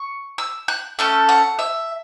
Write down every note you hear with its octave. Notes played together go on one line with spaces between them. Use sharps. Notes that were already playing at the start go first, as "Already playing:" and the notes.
Already playing: C#6
E6
F#6
A3 C#4 A4
F#5
E5